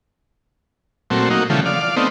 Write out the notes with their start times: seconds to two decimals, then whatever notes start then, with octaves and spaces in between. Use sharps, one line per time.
1.10 A#2 F#3 A3 C4
1.30 A#3 D#4 F#4
1.50 C#3 E3 F3 G3 A3
1.66 D5 F5
1.96 A3 B3 C4 D#4